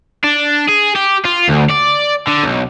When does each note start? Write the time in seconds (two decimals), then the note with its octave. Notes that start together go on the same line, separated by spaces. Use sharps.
0.24 D4
0.68 G#4
0.95 G4
1.25 F4
1.49 D2
1.70 D5
2.28 D3
2.45 B1